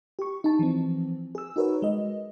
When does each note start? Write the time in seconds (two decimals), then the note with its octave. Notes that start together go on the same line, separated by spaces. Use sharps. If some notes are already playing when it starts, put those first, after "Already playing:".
0.19 G4 C#6
0.44 D#4 A5
0.59 E3 F3 C4
1.35 G#4 E6
1.56 D#4 F#4 A#4 B4 C#5
1.82 G#3 D#5